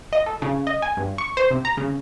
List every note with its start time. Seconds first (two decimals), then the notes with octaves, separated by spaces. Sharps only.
0.13 D#5
0.26 A4
0.42 C#3
0.67 D#5
0.82 G#5
0.97 G2
1.18 C#6
1.37 C5
1.51 C3
1.65 A#5
1.77 C#3